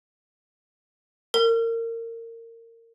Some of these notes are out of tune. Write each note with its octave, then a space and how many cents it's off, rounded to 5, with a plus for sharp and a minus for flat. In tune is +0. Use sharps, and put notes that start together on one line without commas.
A#4 -25